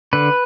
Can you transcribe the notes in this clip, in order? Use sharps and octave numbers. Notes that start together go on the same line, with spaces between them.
D3 B4